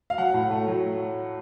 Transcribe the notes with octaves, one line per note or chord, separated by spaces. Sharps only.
F5
F#3 F#5
A2
A3
F#3